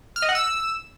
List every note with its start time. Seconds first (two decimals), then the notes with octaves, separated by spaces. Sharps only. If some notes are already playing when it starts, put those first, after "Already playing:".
0.16 F6
0.22 D#5
0.29 F#5
0.35 E6